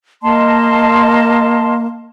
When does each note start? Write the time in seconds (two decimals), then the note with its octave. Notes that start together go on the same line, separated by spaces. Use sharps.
0.23 A#3 D#5 A5 C6